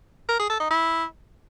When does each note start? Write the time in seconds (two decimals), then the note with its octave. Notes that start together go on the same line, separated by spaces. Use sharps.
0.29 A#4
0.39 G#4
0.50 A4
0.60 D#4
0.71 E4